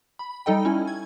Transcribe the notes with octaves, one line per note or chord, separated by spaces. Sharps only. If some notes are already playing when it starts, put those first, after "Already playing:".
B5
G3 D#4 A4 D#5 G5
C#4 E4
G#6